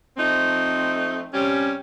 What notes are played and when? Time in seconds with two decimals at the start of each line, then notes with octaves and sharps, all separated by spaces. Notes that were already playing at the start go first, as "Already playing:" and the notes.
0.17 F3 A3 C4 D#4
1.34 C3 G3 C#4